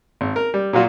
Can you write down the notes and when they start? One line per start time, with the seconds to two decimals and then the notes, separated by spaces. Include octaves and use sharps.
0.21 G#1
0.36 A#4
0.54 G3
0.73 A#2 F#3 F4 F#4